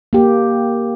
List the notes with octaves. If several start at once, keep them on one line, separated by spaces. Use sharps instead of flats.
A#3 G4